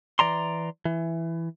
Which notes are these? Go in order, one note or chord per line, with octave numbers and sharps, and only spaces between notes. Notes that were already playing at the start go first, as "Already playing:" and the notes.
E3 D5 A#5 C6
E3